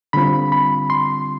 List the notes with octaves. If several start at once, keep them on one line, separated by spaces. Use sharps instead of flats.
D3 G3 C4 F4 B5
B5
C6